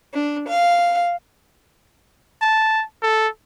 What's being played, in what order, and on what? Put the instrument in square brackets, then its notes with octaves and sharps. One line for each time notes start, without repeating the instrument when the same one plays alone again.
[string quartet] D4
F5
[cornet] A5
A4